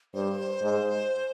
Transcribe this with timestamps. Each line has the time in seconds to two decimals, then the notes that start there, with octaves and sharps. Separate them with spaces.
0.14 G2 C5
0.62 G#2